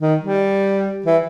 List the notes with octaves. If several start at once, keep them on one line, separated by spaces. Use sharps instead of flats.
D#3
G3
E3